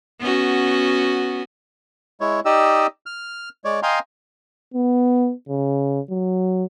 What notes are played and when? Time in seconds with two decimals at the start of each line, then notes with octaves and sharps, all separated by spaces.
0.20 B3 C#4 F#4
2.21 G#3 E4 C#5
2.45 D#4 G4 D5 D#5 E6
3.06 F6
3.65 G#3 C#5 D5
3.83 D#5 F5 G5 G#5 A#5 C6
4.74 B3
5.49 C#3
6.10 F#3